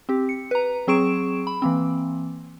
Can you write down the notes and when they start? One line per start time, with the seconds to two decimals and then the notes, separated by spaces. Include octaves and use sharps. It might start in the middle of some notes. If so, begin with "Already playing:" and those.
0.09 C4 G4
0.29 C#7
0.51 B4 A#5
0.87 F#3 C4 G#4 C#6 D7 E7
1.47 B5
1.62 E3 A#3 C4